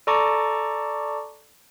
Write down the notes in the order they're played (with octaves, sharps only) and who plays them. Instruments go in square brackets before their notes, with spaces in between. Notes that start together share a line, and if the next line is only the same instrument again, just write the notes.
[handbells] A4 D5 A5 A#5 C#6 D6